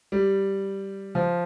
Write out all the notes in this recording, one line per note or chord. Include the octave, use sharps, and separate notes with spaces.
G3
F3